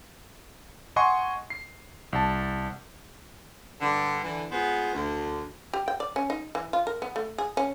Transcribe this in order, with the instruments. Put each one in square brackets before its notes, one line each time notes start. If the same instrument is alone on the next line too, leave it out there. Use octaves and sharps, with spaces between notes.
[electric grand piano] D#5 F#5 G#5 C6 C#6
C7
C2 A5
[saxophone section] G2 D3
D3 E3
G#3 B3 F4 G#4 C5
D2
[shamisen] G4
G5
D5
C#4
D#4
E3
F4
A#4
B3
A3
G#4
C#4